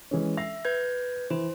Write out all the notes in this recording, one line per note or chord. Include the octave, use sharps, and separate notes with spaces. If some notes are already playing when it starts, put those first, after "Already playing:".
E3 G#3 C#4
E5 A#6 C7 F7
B4 G6 G#6
E3 E4 C5 E7